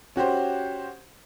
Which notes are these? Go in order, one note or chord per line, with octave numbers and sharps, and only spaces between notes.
C#4 F#4 G4 C5